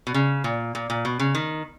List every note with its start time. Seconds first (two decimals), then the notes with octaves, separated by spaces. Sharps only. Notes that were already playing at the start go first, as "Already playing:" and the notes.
0.07 B2
0.14 C#3
0.44 A#2
0.75 A#2
0.90 A#2
1.05 B2
1.19 C#3
1.35 D#3